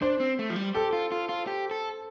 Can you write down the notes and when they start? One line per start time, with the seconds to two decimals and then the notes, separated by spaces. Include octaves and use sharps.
0.02 D4 C5
0.20 C4
0.39 A3
0.50 F3
0.56 G3
0.75 G4 A4
0.93 F4
1.12 F4
1.29 F4
1.47 G4
1.71 A4